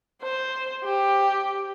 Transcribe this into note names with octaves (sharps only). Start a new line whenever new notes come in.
C5
G4